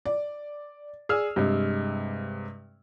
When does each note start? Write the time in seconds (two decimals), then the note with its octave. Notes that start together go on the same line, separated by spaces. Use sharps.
0.06 D5
1.09 G#4 D5 E6 F6
1.36 G2 C3 G#3